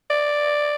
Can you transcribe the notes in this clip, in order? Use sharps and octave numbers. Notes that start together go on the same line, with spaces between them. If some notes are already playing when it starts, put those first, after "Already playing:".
D5